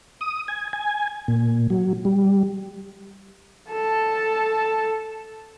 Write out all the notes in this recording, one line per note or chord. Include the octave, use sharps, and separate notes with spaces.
D#6
G#5
G#5
A#2
F#3
G3
A4 A5